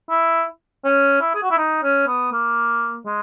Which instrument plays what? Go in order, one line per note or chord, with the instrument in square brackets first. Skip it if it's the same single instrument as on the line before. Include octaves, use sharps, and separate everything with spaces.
[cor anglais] E4
C#4
E4
G#4
F#4
E4
D#4
C#4
B3
A#3
G#3